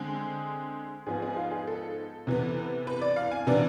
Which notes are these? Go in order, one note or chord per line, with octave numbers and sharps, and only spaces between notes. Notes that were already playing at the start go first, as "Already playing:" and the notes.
Already playing: D3 G#3 C4 G#4
G#2 F3 B3 G#4
G#4
F4
G#4
A4
C3 E3 B3
B4
D5
F5
G#5
C3 E3 B3 D4